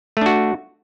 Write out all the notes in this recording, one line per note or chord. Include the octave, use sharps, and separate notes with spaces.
A3 D4 F#4